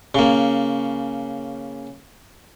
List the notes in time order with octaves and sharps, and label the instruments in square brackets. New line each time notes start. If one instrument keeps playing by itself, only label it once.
[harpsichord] C#3 A#3